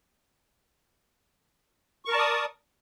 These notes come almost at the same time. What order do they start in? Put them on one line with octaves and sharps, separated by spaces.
C#6 A#4 A5 D5 D#6